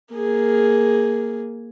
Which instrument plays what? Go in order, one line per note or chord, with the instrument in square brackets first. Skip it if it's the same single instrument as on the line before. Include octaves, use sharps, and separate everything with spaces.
[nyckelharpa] A#3 G#4